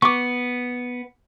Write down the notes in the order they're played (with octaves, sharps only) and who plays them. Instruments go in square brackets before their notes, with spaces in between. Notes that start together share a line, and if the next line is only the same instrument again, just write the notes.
[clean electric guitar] B3 [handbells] C#6 D6